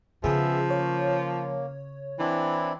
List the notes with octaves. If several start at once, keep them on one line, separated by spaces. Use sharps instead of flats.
C#3 F3 B3 G#4 E5
A#3 C#5
E3 C4 D4 E4